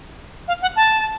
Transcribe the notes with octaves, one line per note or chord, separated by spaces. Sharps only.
F5
F#5
A5